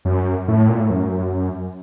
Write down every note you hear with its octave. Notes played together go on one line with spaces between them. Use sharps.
F#2
A2
A#2
A2
F#2